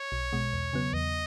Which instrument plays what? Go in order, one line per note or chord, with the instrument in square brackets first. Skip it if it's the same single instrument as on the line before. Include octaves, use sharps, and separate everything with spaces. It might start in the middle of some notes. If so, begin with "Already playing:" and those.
Already playing: [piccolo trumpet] C#5
[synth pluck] B1
B2 G#3
E2
C#3 F#3 B3
[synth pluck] E2 [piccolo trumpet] D#5